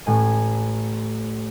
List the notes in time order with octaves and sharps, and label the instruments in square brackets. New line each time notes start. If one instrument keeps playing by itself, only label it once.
[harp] A1 A2 G#5 D#7